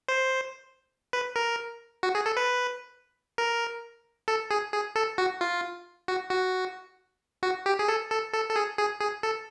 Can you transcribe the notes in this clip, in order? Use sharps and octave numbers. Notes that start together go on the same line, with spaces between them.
C5
B4
A#4
F#4
G#4
A4
B4
A#4
A4
G#4
G#4
A4
F#4
F4
F#4
F#4
F#4
G4
G#4
A4
A4
A4
A4
G#4
G#4
G#4
A4